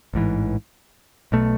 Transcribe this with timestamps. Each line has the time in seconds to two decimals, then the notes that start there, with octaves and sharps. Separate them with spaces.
0.14 A1 G#2 E3
1.32 B1 B2 A3